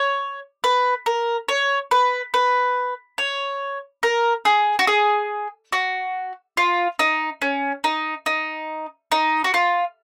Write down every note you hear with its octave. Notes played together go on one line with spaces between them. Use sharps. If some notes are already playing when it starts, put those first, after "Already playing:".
Already playing: C#5
B4
A#4
C#5
B4
B4
C#5
A#4
G#4
F#4
G#4
F#4
F4
D#4
C#4
D#4
D#4
D#4
F#4
F4